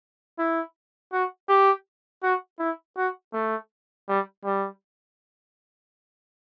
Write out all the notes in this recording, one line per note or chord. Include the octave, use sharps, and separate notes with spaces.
E4
F#4
G4
F#4
E4
F#4
A3
G3
G3